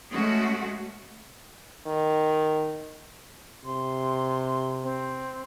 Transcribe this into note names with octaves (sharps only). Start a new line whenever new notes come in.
G#3 A3 C#4 F#4 G#4
D#3
C3 C6
C4